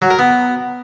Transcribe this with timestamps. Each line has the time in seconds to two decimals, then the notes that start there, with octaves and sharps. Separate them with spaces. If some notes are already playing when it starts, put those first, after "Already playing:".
0.02 F#3
0.10 A#4
0.19 B3